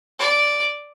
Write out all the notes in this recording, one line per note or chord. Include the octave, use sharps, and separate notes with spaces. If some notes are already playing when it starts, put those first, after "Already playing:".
D5